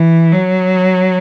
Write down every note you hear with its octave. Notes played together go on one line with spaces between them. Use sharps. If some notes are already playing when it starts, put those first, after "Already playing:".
Already playing: E3
F#3